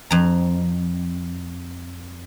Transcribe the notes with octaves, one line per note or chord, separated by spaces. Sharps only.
F2 A#5